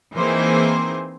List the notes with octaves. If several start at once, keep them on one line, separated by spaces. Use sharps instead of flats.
E3 A#3 C4 D#4 G#4 C5